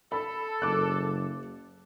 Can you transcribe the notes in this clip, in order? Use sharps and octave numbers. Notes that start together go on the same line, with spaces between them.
A4 B5
F#1 D6 F#6